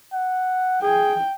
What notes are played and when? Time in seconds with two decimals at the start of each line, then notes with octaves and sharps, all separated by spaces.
0.13 F#5
0.82 G#4 G5